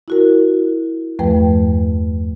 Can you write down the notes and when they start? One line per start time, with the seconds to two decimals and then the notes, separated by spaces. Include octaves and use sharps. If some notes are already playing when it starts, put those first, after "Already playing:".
0.08 E4 F#4 A#4
1.19 E2 G2 F3 A3 B4 G5